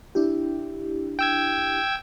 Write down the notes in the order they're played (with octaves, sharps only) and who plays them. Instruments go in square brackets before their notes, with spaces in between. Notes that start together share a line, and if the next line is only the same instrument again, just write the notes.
[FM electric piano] D4 E4 G4
[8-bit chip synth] G5 E6 G#6